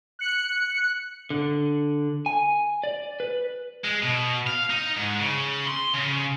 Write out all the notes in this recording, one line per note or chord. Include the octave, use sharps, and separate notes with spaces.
F#6 C#7
D3
G#5
D5
B4
G#3
B2
F5
D#4
G#2
C#3
C6
C#3